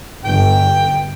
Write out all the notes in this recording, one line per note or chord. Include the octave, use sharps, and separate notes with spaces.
G1 G5